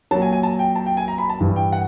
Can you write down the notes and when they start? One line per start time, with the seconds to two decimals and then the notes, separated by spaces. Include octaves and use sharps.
0.11 F#3 A5
0.15 A#2
0.22 G#5
0.33 G#5
0.43 A5
0.59 G5
0.76 A5
0.86 G5
0.97 G#5
1.08 A#5
1.18 B5
1.30 A5
1.40 G2 E3
1.56 G5
1.72 F#5